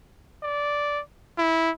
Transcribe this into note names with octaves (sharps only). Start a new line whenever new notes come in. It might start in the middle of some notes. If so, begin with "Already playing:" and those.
D5
E4